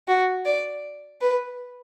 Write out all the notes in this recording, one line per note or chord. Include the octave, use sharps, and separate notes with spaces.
F#4
D5
B4